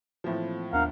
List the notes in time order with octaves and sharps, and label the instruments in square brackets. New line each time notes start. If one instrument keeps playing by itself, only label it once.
[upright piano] A2 F3 [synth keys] E3 A#3 C4
[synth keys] D#2 B3 D4 [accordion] A#4 F5 F#5